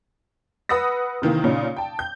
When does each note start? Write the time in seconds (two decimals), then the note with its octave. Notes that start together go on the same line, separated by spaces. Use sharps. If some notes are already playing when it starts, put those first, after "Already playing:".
0.69 B4 F#5 D#6 E6 A#6
1.22 C3 D#3 E3 A#3
1.44 A#2 C#3 C#4 D#4
1.76 G5 A5
1.99 G6